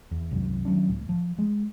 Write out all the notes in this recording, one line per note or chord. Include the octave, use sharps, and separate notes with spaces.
E2
C2 F#2
D#3 F#3 C#4 D4
C#2 A2
F3
G#3